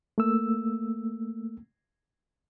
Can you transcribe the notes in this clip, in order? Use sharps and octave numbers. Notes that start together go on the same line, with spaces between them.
A3 A#3 E6